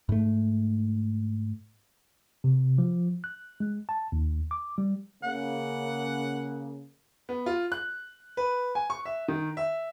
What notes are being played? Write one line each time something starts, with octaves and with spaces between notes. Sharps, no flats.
G#2 A3
C3
F3
F#6
G#3
A5
D#2
D6
G3
C#3 A#3 F#5
B3
F4
F#6
B4
G#5
C#6
E5
D#3
E5